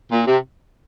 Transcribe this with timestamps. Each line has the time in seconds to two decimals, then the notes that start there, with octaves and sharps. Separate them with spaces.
0.12 A#2
0.26 C3